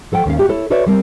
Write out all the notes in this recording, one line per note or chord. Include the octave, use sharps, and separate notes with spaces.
F3 A4 F#5 G5
D#2 C#4 F5
F#4 G4 E5
E4 A4 C#5
F#4 A4 B4 C#5 D5 E5
G3 C4 A#4